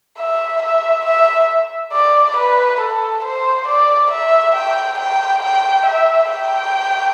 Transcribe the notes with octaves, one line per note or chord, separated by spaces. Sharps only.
E5
E5
E5
D5
B4
A4
C5
D5
E5
G5
G5
G5
E5
G5